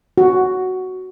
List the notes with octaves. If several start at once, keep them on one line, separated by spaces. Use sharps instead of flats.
F#4